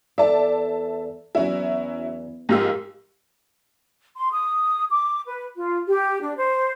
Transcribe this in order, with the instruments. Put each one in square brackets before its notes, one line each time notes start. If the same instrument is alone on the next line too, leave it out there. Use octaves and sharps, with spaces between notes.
[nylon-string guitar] E2 A4 D5 [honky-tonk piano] E5 A5
[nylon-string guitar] E2 [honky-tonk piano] F#3 C#4 E4
[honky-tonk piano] G#2 F4 E6 [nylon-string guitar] F3 G4 A#4
[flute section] C6
D#6
D6
B4
F4
G4
D4
C5